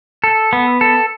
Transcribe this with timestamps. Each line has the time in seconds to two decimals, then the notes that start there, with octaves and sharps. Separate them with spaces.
0.24 A4
0.53 B3
0.81 A4